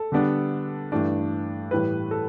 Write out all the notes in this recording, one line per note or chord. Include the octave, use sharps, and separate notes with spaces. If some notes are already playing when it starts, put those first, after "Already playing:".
Already playing: A4
D3 G3 B3 D4
G2 E3 A3 D4
A2 E3 G3 B4
A4